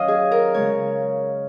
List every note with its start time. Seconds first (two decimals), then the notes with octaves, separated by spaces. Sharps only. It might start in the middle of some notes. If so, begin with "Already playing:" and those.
Already playing: D#3 F#3 C#4 C#5 D#5 F5
0.08 G#4
0.32 A#4
0.54 C#3 G#3 D#4 C#5